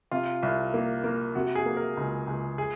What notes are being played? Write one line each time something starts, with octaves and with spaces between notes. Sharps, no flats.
C3 F4
C2
A#3
A#3
C3 F#4
G#4
A#3
A#4
C#2
C#2
G#4